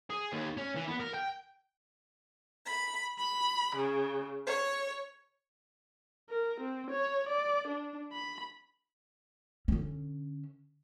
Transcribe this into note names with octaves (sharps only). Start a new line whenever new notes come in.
G#4
D#2
C#4
E3
B3
A#4
G5
B5
B5
C#3
C#5
A#4
C4
C#5
D5
D4
B5
D3 C#4